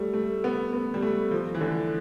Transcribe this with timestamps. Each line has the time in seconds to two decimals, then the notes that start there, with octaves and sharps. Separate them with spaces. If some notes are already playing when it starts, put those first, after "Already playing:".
Already playing: G3 A3
0.14 A3
0.44 B3
0.73 B3
0.94 G3
1.02 A3
1.31 F3
1.54 E3
1.61 D3